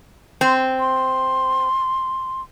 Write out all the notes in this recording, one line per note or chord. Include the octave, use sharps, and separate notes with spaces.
C4
C6